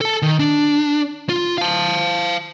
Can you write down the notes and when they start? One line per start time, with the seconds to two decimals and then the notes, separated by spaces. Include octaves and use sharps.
0.01 A4 A5
0.22 D#3
0.40 D4
1.29 F4
1.58 F5 A5